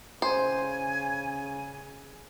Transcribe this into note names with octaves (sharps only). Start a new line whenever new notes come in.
C#3 C5 G#5